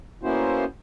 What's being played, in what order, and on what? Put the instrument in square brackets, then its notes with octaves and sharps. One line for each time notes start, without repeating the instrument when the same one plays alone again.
[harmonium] A#3 B3 C#4 E4 F#4 C5